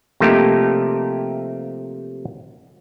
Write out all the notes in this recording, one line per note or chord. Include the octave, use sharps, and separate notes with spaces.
C3 F3 A3 A#3 D#4 G4